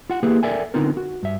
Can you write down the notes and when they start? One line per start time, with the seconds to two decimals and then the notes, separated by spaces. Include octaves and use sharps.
0.10 F4 F#5
0.23 A#3 E4 G4 G#4 B4
0.43 A4 A#4 D5 E5 G5 G#5
0.74 D3 B3 C4 D#4 F4 A#4
0.97 F#4
1.23 G2 E5